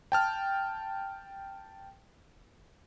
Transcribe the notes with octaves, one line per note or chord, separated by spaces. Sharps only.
G5 A5 F6